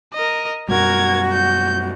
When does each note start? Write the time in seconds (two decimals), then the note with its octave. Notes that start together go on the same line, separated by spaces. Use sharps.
0.14 A#4 D#5
0.69 F#2 B2 G3 F#4 A#4 G#6
1.33 G6